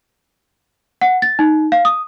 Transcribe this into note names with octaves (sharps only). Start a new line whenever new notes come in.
F#5
A6
D#4
F5
D#6